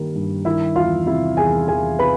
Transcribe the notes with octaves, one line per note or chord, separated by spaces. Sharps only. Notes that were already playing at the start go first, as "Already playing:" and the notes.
Already playing: G2 D#3 G3 A#3
G2
D#3 E4 E5
E2 F4 F5
C3 E4 E5
E2 G#4 G#5
E2 G#4 G#5
C3 B4 B5